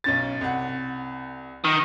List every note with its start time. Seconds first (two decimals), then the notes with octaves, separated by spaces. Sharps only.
0.04 B1 C#4 A6
0.41 C2 F#5
1.64 D#3